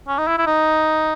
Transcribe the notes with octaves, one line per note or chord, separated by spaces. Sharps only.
C#4
D#4
E4
E4
D#4